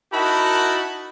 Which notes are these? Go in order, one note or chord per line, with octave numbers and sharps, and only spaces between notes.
D#4 E4 F#4 A#4 A5 B5